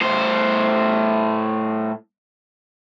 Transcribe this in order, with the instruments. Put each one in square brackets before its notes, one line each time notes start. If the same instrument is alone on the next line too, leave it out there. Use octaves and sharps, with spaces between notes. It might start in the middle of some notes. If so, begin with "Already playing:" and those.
[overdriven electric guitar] A2 C5